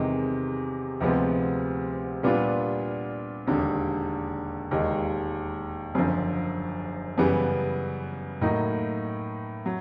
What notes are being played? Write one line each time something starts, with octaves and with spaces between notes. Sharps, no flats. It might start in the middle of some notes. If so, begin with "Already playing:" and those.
Already playing: E2 C3 D#3 G#3
D2 C3 F3 G#3 B3
A#2 G3 B3 D4 F4
E1 D#2 D3
E1 D#2 D#3 G#3
F#1 F#2 D3 F3
F#2 C#3 E3 G3 B3
A2 F#3 A#3 D#4
F#3